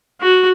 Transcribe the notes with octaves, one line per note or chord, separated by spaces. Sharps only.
F#4